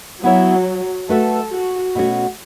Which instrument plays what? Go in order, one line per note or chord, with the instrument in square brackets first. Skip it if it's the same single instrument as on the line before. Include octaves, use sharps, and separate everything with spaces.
[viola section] F#3 [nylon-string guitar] B3 E4 C#5 E5
[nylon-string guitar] A3 F#4 B4 E5 [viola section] A4
[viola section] F#4
[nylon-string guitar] B2 A3 C#4 F#4